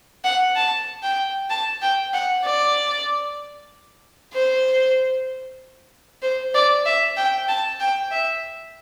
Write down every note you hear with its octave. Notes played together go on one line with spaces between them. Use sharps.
F#5
A5
G5
A5
G5
F#5
D5
C5
C5
D5
E5
G5
A5
G5
E5